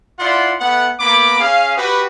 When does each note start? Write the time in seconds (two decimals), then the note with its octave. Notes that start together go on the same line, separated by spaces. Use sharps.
0.20 E4 F4 D5 F#5 C6
0.60 A3 B3 F#5
1.00 A#3 B3 B5 D6
1.40 C#4 G#4 F5
1.77 F#4 G4 B4